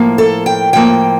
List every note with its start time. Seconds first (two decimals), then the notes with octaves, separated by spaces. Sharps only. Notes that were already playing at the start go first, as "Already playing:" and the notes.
Already playing: A2 F3 A#3
0.18 A4
0.46 G5
0.73 A2 F3 A#3 G5